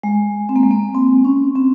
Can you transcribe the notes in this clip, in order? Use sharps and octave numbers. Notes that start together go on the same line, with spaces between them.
G#3
C4
A#3
G#3
A#3
C4
C#4
C4